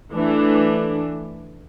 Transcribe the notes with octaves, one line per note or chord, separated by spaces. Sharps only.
E3 A3 D4